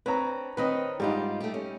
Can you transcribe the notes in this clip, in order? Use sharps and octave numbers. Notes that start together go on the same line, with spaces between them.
C4 D4 B4 C#5 A#5
D#3 C4 B4 C#5 D#5
G#2 G3 D#4 F4 G4
A3 G4
C#4